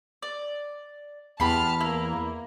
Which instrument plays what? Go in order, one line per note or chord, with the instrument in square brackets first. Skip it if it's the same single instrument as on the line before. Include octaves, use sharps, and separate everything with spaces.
[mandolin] D5
[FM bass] E2 [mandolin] G4 B5 C6 [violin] A5 F6
[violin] A#3 [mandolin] E4